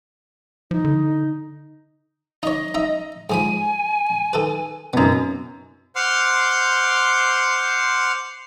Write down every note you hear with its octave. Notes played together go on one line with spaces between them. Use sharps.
F3 D#4
D3
D#4 C#5 D#5
D#4 E5
G#2 F3 G#5 B5
D#3 A4 B4
F#2 B2 B3 D#4
C5 F#5 C6 D6 F6 G6